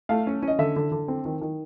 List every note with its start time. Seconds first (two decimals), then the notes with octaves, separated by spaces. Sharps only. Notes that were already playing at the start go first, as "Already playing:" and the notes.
0.09 A3 F5
0.27 C#4
0.43 C#4 D#5
0.59 D3 E5
0.76 D3
0.92 D3
1.08 C4
1.25 D#3
1.41 D#3